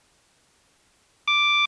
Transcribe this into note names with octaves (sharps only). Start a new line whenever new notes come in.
D6